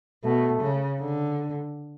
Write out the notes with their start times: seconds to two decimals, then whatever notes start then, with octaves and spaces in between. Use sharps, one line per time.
0.24 B2 A3
0.61 C#3
1.00 D3